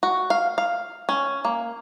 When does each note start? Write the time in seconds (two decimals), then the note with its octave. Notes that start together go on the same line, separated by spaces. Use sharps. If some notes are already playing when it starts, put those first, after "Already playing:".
0.03 F#4
0.30 F5
0.58 F5
1.09 C#4
1.45 A#3